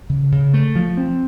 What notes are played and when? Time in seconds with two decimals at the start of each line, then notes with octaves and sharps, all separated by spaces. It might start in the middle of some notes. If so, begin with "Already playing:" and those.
0.10 C#3
0.32 C#3
0.54 A3
0.76 F3
0.97 C4